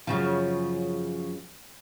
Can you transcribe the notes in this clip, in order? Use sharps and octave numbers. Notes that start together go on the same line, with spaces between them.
F#2 C#3 F3